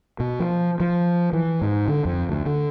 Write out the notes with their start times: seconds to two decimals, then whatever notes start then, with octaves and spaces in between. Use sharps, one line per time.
0.20 B2
0.40 F3
0.80 F3
1.33 E3
1.61 G#2
1.88 D3
2.05 F2
2.29 D2
2.46 D3